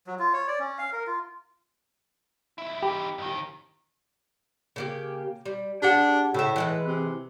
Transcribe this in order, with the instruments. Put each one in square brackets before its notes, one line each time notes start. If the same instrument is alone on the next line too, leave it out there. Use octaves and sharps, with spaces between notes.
[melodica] F#3
F4
C#5
D5
C#4
F5
A#4
F4
[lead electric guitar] B1 E4
[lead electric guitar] E3 D#4 [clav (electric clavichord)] G4
[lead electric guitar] F2 D#3
[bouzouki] C#3 A#3 G4
G3
[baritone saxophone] D4 [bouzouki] G4 G#4 F#5
[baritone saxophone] A2 [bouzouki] C#3 E5
[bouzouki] E3 G#3 B4
[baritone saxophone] C3